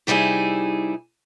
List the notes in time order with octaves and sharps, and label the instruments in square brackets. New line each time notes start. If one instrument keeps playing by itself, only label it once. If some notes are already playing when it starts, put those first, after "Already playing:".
[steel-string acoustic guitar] C3 G3 D#4 E4 G#4